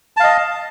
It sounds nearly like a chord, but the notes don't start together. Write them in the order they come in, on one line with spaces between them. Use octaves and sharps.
A5 F5 D#5